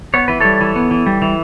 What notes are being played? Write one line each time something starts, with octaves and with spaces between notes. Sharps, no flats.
B3 C#5
E3 B4
G3 A4 C#5
E3
B3
E3
G3
E3